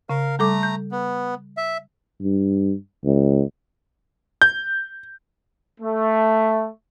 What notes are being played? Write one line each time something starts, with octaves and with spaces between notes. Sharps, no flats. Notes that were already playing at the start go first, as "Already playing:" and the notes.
C#3 A#4 F5
G3 A3 A4 A#5 D6
G6
B3
E5
G2
C#2
G6
A3